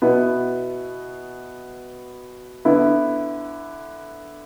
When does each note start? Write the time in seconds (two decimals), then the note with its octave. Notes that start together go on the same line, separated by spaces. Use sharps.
0.02 B2 B3 E4
2.65 D3 B3 E4